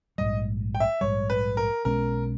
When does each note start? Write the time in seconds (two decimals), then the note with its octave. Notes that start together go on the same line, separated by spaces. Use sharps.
0.18 A#1 G#2 G3 D#5
0.75 G5
0.80 E5
1.01 A#1 G#2 G3 C#5
1.30 B4
1.57 A#4
1.85 B1 B2 G#3 C#4 A#4